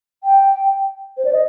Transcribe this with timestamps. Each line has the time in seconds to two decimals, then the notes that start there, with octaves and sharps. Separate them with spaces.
0.24 G5
1.17 C5
1.25 D5
1.33 D#5